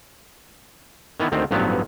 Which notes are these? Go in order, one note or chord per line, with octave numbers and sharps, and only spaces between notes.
D#3 E3 B3
D2 D#3 C4
A1 G2 F3 F#3 B3